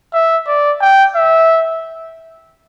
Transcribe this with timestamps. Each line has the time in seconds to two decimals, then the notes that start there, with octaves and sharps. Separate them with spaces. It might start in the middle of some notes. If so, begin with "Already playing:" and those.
0.14 E5
0.47 D5
0.81 G5
1.15 E5